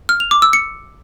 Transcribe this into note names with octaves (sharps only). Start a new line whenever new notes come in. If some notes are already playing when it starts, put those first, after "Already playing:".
F6
F7
D6
E6
C#7